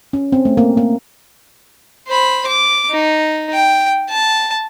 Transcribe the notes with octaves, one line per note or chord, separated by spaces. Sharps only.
C#4
C4
A3
A#3
A#3
C5 B5
D6
D#4
G5
A5